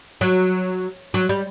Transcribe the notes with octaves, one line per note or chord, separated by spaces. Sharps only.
F#3
F#3
G3